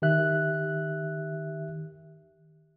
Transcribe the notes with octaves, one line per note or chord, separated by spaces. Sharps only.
D#3 G4 E5 F#6